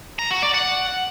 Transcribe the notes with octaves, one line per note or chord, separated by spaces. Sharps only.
A#5
F#4
D5
F#5